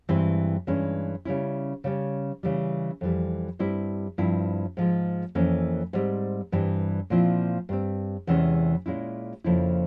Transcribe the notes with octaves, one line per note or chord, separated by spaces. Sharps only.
G2 E3 G#3 C4 E4
G2 E3 G#3 C#4
C#3 G3 C#4 E4
C#3 G3 C#4
C#3 E3 G3
F2 E3 G3
G2 G3 C4 E4
G2 F3 C4 E4
G#2 F3 G#3
F2 E3 A#3 C#4
G#2 G3 C4
G2 E3 G3 C4
A#2 F3 C4 E4
G2 G3 C4
E2 C3 E3 G#3 C#4
A#2 G#3 C#4 E4
F2 C#3 F3 A#3 E4